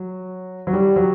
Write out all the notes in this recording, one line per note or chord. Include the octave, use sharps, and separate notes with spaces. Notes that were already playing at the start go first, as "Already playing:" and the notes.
Already playing: F#3
F#3
G3
F#3